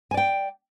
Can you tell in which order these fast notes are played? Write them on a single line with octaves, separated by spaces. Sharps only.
G#5 D5 G5